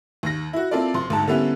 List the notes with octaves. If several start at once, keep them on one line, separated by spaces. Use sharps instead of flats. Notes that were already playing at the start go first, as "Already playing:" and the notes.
D#2 A#6
E4 F#4
A#3 C4 E4 F4 A4 D5
F#1 C6
D2 G#2 A5
D3 G3 A#3 B3 C#4 E4